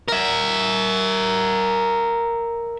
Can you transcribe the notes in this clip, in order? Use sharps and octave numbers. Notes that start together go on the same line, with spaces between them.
A#4 E5